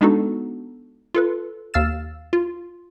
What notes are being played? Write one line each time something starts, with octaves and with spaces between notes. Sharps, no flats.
G#3 B3 D4 D#4 F#4 A4
F4 A4 B4
D#2 F5 E6 F6 A6 E7
F4